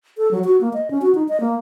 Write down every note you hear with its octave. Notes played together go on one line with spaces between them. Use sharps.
A4
F#3
F#4
A#3
D#5
C#4
F#4
D#4
D#5
A#3